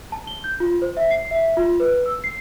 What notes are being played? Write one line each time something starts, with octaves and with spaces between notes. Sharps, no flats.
A5
G7
G6
F4
C5
E5
C7
E5
F4
B4
E6
C7